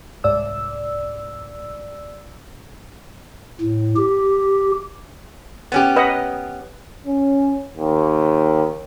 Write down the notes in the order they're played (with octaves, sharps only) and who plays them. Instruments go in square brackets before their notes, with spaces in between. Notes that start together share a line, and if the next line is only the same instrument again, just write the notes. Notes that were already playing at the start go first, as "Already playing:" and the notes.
[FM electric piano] C2 G#2 D5 E6
[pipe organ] A2
G4
[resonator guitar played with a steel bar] B3 C#4 G4
[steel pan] B4 D#5 F#5
[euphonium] C#4
D#2